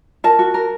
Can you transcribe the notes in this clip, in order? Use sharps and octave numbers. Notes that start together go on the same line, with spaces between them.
A#4 A5
F#4
A#4